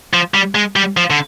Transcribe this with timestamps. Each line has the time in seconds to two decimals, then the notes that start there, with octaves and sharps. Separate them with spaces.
0.13 F3
0.34 G3
0.55 G#3
0.76 G3
0.97 F3
1.10 D3